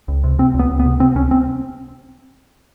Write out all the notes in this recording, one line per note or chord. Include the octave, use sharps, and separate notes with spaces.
C#2
C3
C3 C4
C#2
B3
C#2
B3
C3
C3 C4
C#2 C#4
C4